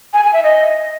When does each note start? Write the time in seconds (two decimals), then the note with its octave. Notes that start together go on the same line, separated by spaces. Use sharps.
0.13 G#5
0.23 G#5
0.34 E5
0.44 D#5